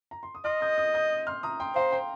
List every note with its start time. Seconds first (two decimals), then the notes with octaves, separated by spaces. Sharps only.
0.11 A#5
0.23 C6
0.35 D#6
0.45 D#5 C6 F6
0.61 D#6 G6
0.78 D#6 G6
0.94 D#6 G6
1.27 C6 F6
1.43 A#5 D#6
1.60 G5 C6
1.75 C5 F5 A#5
1.92 G5 C6